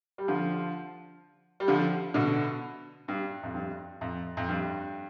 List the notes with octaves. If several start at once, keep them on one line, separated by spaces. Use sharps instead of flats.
G3
D3 F3
G3
D3 F3
B2 D3
G2
F2
G2
F2
F2
G2